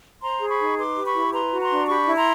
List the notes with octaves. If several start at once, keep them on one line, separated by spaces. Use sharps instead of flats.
C5 A#5 C6
G#4
B5 C#6
D#4
B4 C6 D6
G4
B5 C#6
E4
B4 A#5 C6
F#4
A#5 C6
D4
G4 B5 C#6
E4
A#5 C6